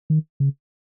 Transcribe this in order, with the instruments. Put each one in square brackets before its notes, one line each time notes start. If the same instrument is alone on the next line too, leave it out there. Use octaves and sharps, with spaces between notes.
[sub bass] D#3
C#3